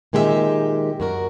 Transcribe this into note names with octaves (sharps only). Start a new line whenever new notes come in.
A#2 D#3 G#3 G4 A#4 E5
F#2 F#4 A#4